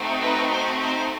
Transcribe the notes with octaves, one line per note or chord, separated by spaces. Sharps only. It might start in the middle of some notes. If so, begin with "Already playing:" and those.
Already playing: A3 C4 D#4 F#4
B4
C5
C5